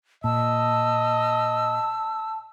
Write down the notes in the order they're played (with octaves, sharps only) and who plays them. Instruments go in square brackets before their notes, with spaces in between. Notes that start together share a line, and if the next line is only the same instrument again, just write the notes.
[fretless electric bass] A#2 [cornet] D#5 [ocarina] A5 [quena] E6